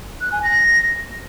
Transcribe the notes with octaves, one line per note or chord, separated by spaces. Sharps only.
F#6
G#5
A#6